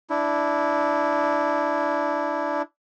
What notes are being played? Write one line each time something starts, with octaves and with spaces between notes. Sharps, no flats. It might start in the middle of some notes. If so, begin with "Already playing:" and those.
D4 E4